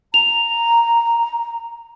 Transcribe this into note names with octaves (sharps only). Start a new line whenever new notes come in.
A#5 F7